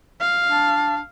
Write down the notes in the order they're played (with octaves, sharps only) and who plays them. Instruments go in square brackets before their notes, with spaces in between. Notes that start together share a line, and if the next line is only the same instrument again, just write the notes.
[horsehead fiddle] F5
[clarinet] D4